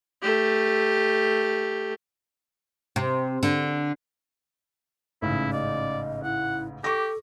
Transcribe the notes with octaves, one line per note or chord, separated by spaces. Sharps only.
A3 G4
C3
D3
A1 G#2 C#3 E4
D5 D#5
E4 F#5
G4 A4 C#6 D6 A#6